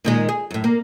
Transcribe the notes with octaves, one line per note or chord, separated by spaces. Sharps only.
A#2 D#3 G#3
G#4
F#2 A2
A#3